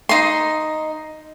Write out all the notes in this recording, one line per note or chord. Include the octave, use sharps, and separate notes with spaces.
D#4 C6